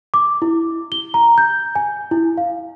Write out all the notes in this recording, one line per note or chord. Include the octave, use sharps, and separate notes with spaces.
D6
E4
G7
A#5
G6
G#5
E4
F5